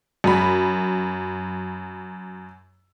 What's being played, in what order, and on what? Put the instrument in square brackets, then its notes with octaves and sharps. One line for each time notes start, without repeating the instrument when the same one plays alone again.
[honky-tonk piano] F#2 B5